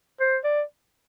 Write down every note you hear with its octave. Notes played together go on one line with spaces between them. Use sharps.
C5
D5